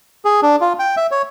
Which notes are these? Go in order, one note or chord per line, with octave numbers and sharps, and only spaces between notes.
G#4
D4
F4
G5
E5
C#5